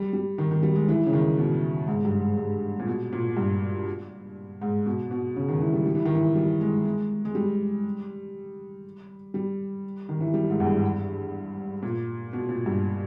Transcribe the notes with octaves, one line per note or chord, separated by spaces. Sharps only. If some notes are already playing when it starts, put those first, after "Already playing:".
Already playing: G3
G3
D#3
D#3
G3
G#3
E3
C#3
D#3
B2
G#2
G2
G#2
G#2
A#2
B2
A#2
G2
G#2
B2
B2
C#3
D#3
E3
G3
G3
E3
D#3
E3
G3
G#3
G#3
G#3
G3
G3
D#3
E3
G3
G#2
E2
G2
A#2
B2
A#2
G2